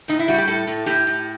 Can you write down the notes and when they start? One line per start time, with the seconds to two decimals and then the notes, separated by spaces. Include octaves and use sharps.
0.08 A2 D#4
0.19 E4
0.28 G3 F#4
0.38 G4
0.47 A2 A4
0.67 A2
0.86 A2 G4
1.07 A2